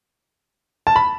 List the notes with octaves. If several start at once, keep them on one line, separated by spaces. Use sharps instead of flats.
A5
B5